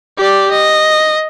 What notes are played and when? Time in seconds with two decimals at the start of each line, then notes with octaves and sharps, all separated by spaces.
0.18 G4 D5
0.51 D#5